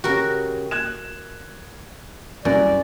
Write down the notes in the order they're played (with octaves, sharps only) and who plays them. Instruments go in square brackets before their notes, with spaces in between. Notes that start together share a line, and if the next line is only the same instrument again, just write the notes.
[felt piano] C#3 G4 [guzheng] F#4 A#4
[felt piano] F#6 G#6 E7
[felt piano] C2 [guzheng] F#2 [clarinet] D5